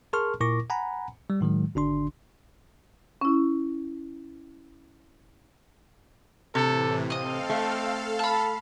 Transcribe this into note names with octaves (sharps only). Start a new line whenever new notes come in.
G#4 A#4 A5 C6 C#6 F6
A#2 E4 A#4 C#6 D6 A#6
F#5 G#5 A#5 B5
G3
A2 D#3 F#3 G#3
G#1 D3 D4 C6
C#4 E4
A2 C3 E3 A4
C4 A4 D#5 F5 D#6
A3
A5 B5